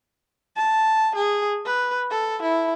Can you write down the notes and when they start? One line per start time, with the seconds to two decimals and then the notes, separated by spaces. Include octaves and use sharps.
0.56 A5
1.15 G#4
1.65 B4
2.11 A4
2.42 E4